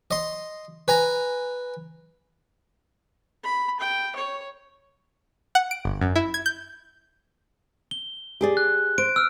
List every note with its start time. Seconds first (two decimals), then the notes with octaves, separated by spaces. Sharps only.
0.11 D#5 C6
0.88 B4 G#5 A#5
3.44 B5
3.80 G5
4.16 C#5
5.55 F#5
5.71 D7
5.85 G1
6.01 F#2
6.16 E4
6.34 G#6
6.46 G6
7.91 G7
8.41 G4 G#4 D5
8.57 F#6
8.98 C5 D7
9.16 E6 F6